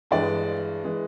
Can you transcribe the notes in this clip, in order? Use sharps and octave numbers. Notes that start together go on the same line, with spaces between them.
G2 E3 G#3 D5
E3 G#3